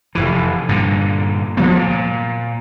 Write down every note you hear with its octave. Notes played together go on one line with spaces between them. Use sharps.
F1 B1 E3
G2 A#2 D3
C#2 F3 A#3 B3
A#2